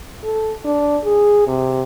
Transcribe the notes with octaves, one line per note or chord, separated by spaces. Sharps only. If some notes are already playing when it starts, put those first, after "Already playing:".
A4
D4
G#4
C3